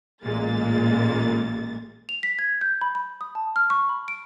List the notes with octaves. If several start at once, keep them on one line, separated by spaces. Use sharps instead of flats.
A1 A#2 G#3 A#3 A6
F7
B6
G#6
G6
B5
B5
D#6
A5
F6
C#6
B5
D7